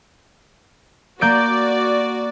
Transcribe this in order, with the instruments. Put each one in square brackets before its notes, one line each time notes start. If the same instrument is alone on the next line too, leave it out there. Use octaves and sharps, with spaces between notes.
[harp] A#3 G6 D7 [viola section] F#4 D5